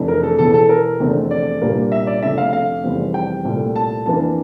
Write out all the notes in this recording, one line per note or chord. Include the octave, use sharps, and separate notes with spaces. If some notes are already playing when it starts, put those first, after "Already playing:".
Already playing: F1 F2 E3 A3 D4
A#4
A4
E1 E2 E3 A4
A4
A#4
F1 E2 D3 A3 C4
D5
C2 A#2 G3 A#3 D4
E5
D5
F1 F2 D3 A3 E5
F5
F5
F1 E2 E3 G3 C4
G5
C2 A#2 A3
A5
F2 E3 A#3 D4 A5